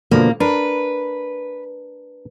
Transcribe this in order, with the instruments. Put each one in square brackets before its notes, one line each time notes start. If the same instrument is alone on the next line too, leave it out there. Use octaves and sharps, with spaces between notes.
[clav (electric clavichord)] B2 D3 F3 [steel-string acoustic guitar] A#3
[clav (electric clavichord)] D4 A#4 [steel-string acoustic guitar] B4